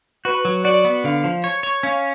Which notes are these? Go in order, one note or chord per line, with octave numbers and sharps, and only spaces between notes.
F#4 B4
F#3
F#4 D5
B3
D3 F5
F3
C#5
C#5
C#4 F5